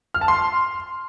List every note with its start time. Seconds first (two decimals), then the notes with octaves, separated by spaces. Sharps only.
0.14 F6
0.21 A5
0.28 C6